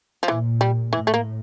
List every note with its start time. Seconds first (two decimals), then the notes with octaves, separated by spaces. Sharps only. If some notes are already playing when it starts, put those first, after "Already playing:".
0.23 F3
0.28 A#2 E3
0.61 G3
0.92 A2 E3
1.07 A3
1.14 A#3